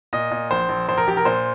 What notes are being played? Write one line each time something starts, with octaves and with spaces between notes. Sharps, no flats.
A#2 D#5
A#2
A#1 C5
A#1
A#1 C5
A#4
A#1 G4
A#4
A#2 C5